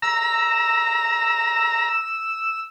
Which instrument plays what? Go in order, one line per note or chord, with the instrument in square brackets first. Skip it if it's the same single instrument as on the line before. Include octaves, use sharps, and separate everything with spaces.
[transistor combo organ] A#5 [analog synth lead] E6